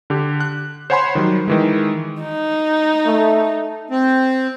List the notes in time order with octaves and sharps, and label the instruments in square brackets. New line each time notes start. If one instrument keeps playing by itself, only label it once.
[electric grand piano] D3 G4
F#6
C5 C#5 F#5 G#5 B5 C6
D#3 F#3 G3
D#3 E3 G#3
[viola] D#4
[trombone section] A3
[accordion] C4